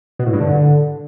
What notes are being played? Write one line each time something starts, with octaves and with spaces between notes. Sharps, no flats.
B2
A2
G2
D3